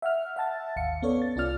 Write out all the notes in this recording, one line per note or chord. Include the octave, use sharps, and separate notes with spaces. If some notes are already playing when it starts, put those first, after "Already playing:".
E5 F#5 F6
E5 F#5 A5 A6
G#1 D#2 F5 C#7
B3 C#4 A4 C#5 D5
A6
C2 C#4 F4 D5 F6